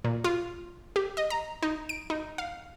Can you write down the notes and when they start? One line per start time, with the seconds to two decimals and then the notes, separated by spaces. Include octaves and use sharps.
0.04 A#2
0.24 F4
0.96 G4
1.17 D#5
1.30 A#5
1.63 D#4
1.89 D7
2.10 D#4
2.38 F5